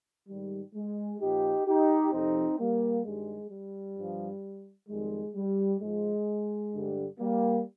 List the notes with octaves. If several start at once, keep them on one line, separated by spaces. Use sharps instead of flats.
G#2 D#3 G3
G#3
A#2 F3 D#4 G4
D#4 G4
F2 C3 F3 C4 D#4
G3 A#3
G2 D#3 G3 G#3
G3
G2 F3
F2 D#3 G3 G#3
G3
G#2 F3 G#3
G2 D3 G3
G3 A#3